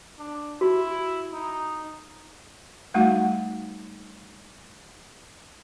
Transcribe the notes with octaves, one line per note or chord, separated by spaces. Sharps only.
D4
E4 F#4
D#4
G3 A3 D#4 F#4 F5 F#5